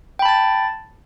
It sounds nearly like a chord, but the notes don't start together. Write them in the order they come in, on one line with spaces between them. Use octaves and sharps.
G5 B5 A5 A6